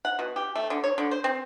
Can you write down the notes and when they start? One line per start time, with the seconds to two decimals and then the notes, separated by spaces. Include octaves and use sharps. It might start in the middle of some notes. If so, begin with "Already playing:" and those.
0.05 F#5
0.19 B2
0.36 G4
0.55 A3
0.70 D3
0.84 C#5
0.98 D3
1.11 C5
1.24 C4